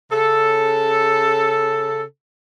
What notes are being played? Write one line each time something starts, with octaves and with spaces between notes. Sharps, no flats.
C#3 A4